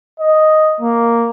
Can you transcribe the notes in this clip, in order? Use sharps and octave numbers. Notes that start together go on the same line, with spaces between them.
D#5
A#3